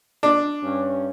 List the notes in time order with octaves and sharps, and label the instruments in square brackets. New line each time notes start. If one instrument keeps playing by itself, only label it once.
[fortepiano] D4
[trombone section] G2 C#4